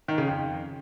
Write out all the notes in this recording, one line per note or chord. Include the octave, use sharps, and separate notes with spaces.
D#3
C#3
F2